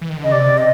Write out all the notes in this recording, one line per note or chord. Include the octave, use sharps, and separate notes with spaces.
E3
D#3
D3
C#3 D#5
C3 D5
D#5